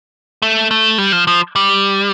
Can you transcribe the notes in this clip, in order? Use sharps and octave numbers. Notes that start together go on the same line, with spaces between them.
A3
A3
G3
F3
F3
G3